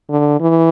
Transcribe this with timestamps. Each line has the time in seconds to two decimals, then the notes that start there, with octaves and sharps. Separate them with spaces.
0.10 D3
0.40 E3